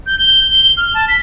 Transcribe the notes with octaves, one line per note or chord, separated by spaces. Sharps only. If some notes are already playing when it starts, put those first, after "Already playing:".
G6
G7
G7
F6
A5
B6